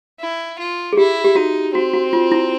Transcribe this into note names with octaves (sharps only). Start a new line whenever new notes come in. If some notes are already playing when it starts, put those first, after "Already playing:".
E4
F4
G#4
E4 G4
G4
D#4 F#4
C4 F#4
F#4
F4
E4